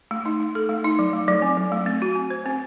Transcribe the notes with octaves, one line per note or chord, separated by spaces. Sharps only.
A3
D#4
A3
A4
A3
D#4
F#3
A3
F#3
C4
F#3
A3
C4
F#4
C4
C5
C4